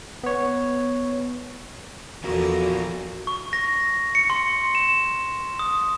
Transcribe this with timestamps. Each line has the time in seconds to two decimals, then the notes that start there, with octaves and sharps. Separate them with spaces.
0.24 B3 C#5
2.24 E2 D3 F3 F4 F#4 A#4 A#5
3.27 C#6
3.53 A#6
4.15 C#7
4.30 C6
4.75 E7
5.59 D#6